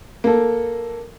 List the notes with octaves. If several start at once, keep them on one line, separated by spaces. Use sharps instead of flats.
A#3 A4